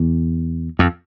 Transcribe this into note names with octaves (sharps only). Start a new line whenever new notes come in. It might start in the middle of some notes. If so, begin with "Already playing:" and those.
Already playing: E2
F2